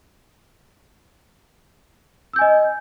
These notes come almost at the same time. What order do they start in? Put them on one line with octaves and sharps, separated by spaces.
E6 G6 G#5 D#5